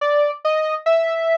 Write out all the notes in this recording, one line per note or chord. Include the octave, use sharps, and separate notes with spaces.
D5
D#5
E5